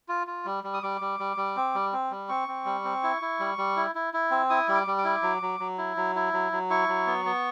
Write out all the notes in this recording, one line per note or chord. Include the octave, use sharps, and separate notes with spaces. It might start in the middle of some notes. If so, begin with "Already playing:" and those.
F4
F4
G3
G3
D#6
G3 D6
G3
G3
G3
C4
G3
C4
G3
C4 C#6
C4
G3
C4
E4
E4
G3
G3
E4
E4
E4
C4
E4 D#6
G3
D6
G3
D6
E4
F#3
F#3
F#3
E4
F#3
E4
F#3
F#3
E4 C#6
F#3
B3
B3